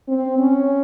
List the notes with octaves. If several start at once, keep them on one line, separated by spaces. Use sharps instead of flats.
C4
C#4